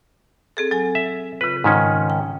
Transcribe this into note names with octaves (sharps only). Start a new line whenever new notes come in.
C4 G#4 A4
F#3 A4 G#5
E5
C#3 F4 B4
G#2 D#3 C#4
G5